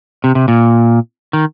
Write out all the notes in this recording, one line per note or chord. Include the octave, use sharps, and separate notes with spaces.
C3
C3
A#2
D#3